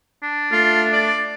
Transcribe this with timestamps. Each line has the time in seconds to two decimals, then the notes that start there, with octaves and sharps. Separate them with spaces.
0.23 D4
0.52 A3 F4
0.93 D5